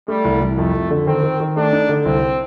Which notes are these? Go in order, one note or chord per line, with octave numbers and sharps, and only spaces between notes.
G3 A3
C2
C2
F2 A3
F2
D3
D#3 C4
D#3
D#3
A3 D4
D#4
D3
C2 C4